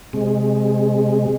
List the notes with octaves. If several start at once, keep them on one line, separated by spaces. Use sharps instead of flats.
C3 G#3